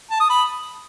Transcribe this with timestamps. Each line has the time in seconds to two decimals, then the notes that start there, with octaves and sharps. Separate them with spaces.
0.11 A5
0.20 D#6
0.29 B5